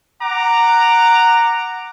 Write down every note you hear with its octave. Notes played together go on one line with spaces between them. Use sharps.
F#5 A#5 D6